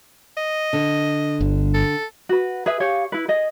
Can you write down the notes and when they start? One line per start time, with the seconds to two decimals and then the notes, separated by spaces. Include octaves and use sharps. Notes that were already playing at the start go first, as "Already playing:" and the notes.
0.37 D#5
0.73 D3
1.41 G1
1.74 A4
2.29 F#4 B4
2.66 G#4 B4 E5
2.80 G4 G#4 C#5 F5
3.12 E4 B4
3.28 G#4 D#5